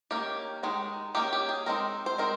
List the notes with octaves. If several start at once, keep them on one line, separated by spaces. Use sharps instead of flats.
D#3 A#3 C#4 G4
D#3 G#3 D#4
D#3 A#3 C#4 G4
G4
G#4
G#3 C4 D#4 A#4
C5
G#3 C4 D#4 A#4